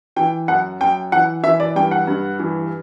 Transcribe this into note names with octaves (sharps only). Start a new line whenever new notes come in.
E3 G5
F#2 F#5
F#2 G5
E3 F#5
E3 E5
D5
G2 G5
F#5
G2
E3